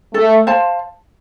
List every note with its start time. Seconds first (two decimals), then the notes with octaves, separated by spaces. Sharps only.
0.14 A3 A4
0.47 C5 F5 A5